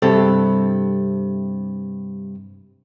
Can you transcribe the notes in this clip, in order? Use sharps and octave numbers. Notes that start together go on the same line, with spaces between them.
G2 C3 A4